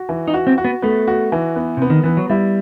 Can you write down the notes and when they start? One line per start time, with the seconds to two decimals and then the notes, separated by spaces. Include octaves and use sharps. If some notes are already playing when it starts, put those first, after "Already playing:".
Already playing: F#4
0.09 E3
0.28 D#4
0.34 F#4
0.47 C4
0.58 F#4
0.65 B3
0.82 A3 B3
1.07 F#4
1.32 E3
1.56 B3
1.77 C3 B3
1.90 D#3
2.04 E3 B3
2.17 F#3
2.30 G3 E4